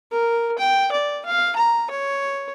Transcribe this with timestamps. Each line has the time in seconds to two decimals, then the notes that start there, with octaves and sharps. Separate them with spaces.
0.12 A#4
0.59 G5
0.92 D5
1.26 F5
1.56 A#5
1.91 C#5